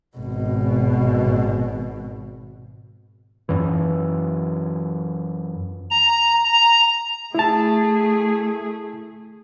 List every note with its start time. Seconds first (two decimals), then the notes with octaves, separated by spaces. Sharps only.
0.17 G#1 B2
3.49 F#2 E3
5.90 A#5
6.44 A#5
7.35 A3 E4 G#4 A5